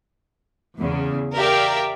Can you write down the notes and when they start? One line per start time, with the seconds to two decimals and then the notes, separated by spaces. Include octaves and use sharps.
0.79 E2 C#3
1.36 G4 A#4 D5 E5 F5 G5